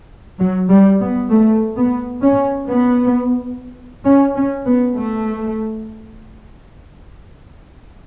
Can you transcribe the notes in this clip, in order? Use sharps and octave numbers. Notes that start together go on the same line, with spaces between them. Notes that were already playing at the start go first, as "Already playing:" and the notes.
F#3
G3
B3
A3
B3
C#4
B3
C#4
C#4
B3
A3